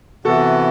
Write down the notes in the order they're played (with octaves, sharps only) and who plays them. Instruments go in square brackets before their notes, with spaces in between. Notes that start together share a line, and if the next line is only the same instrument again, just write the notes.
[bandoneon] C3 E3 B3 [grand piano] F#4 A4